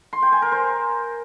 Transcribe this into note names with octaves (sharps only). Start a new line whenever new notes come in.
C6
G5
G#5
A#4
C5